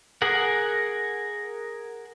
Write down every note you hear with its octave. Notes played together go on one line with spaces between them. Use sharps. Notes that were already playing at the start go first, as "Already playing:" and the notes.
G#4 A#4 F#5